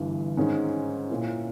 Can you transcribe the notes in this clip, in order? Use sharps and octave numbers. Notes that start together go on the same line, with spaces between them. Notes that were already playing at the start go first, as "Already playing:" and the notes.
Already playing: G1 G2 E3
G#2 D#3 G#3 C#4 G#4
A#2 A#3 C#4 E4